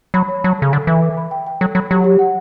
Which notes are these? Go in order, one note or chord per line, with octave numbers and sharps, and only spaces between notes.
F#3 B5
C#5
F#3 A5
C#3 A4
D3 A4
E3 E5
D6
B5
G5
G5
F#3 A4
F#3 B5
F#3 G4
G4
F#5